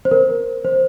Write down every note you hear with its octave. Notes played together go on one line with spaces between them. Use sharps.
C5
A#4
C5